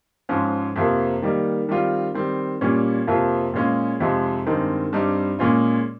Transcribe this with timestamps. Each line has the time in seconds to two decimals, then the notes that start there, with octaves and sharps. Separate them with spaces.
0.29 G#2 F3 G#3 C#4
0.76 F2 C3 F3 A#3
1.22 D#3 G3 A#3 D#4
1.68 D#3 G3 C4 F4
2.14 D#3 G3 C4
2.61 A#2 G3 C#4 F4
3.07 F2 C3 F3 A#3 F4
3.54 A#2 G#3 C#4 F4
4.00 F2 C3 F3 G#3 D#4
4.47 G2 D#3 G#3 C4 D#4
4.92 G2 G3 C4 D#4
5.39 A#2 G#3 C#4 F4